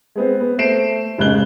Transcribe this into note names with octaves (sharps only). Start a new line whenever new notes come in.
G#3 B3 C4
B3
A3 C5 C7 D7 E7
F1 G#2 C#3 F#6 G7